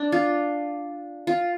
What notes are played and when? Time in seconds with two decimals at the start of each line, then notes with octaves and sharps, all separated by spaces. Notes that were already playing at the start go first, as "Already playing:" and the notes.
Already playing: D4
0.12 F4
1.27 F4